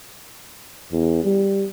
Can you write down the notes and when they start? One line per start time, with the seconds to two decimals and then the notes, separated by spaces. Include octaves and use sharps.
0.93 E2
1.24 G3